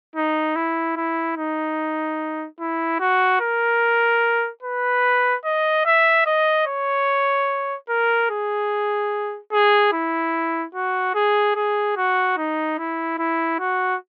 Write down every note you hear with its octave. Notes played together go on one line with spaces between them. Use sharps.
D#4
E4
E4
D#4
E4
F#4
A#4
B4
D#5
E5
D#5
C#5
A#4
G#4
G#4
E4
F#4
G#4
G#4
F#4
D#4
E4
E4
F#4